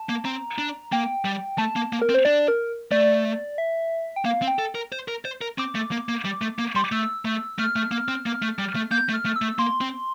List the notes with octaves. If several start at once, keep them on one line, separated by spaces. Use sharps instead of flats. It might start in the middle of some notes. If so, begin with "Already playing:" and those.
Already playing: A5
A#3
C4 A#5
D4
A#3 G5
G3
A3 A5
A#3
A#3
A#4
C4
C5
D4 D5
A#4
A3 D5
E5
G5
A#3 F5
C4
G5
A4
A#4
C5
A#4
C5
A#4
C4 D6
A3
A#3
A#3
G3
A3
A#3
G3 C6
D6
A3 E6
A3
A3 F6
A3
A#3
C4
A#3
A3
G3
A3
A#3 G6
A3
F6
A3
E6
A3
A#3 C6
C4